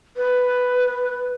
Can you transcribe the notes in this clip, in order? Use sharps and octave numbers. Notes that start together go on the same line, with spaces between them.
B4